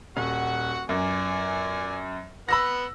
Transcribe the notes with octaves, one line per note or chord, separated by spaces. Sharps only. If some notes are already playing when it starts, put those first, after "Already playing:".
D#1 F#4 F#5
F#2 D5 G#5
B3 F#5 B5 E6 A#6